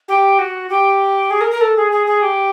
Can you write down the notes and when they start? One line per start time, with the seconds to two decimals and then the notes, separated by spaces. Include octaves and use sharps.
0.08 G4
0.38 F#4
0.69 G4
1.30 G#4
1.41 A#4
1.51 A#4
1.61 A4
1.76 G#4
1.92 G#4
2.06 G#4
2.22 G4